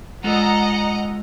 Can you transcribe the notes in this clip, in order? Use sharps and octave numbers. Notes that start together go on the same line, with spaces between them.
G#3 F4 A4 D#5 F#5 A#5